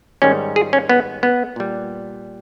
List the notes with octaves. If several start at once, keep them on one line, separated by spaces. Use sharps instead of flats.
G#2 D#3 G3 C#4
G#4
C#4
B3
B3
A#2 G3